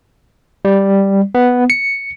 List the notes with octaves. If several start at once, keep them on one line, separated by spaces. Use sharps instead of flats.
G3
B3
C#7